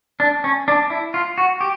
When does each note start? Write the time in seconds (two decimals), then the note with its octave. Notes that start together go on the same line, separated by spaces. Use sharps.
0.20 D4
0.44 C#4
0.68 D4
0.90 E4
1.14 F4
1.38 F#4
1.61 G4